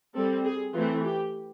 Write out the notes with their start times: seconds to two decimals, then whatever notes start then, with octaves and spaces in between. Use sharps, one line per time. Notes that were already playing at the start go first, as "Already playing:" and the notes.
0.14 G3 C4 A4
0.45 G#4
0.75 E3 A3 C4 F4
1.04 G4